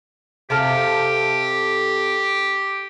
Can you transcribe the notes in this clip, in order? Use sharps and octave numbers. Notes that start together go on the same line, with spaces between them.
C3 G4 A4 F5